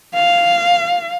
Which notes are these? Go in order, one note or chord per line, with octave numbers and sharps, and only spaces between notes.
F5